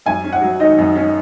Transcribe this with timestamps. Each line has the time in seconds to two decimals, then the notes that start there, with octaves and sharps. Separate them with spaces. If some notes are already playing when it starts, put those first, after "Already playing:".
0.06 F#2 G#5
0.24 C#4
0.33 F#5
0.41 F#3
0.60 D#3 D#5
0.78 F#2
0.95 C#4